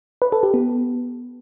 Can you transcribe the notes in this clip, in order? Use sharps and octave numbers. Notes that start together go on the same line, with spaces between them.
B4
A4
G4
B3